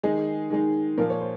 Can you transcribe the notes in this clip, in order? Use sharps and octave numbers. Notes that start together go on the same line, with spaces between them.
D#3 G#3 D#4 G#4
D#3 G#3 D#4
A#2 F3 A#3 A#4
C#5
C5